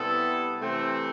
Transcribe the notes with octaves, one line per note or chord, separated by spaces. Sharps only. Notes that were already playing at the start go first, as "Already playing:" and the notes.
Already playing: C3 G3 B3 E4 A4
C3 E3 A3 C4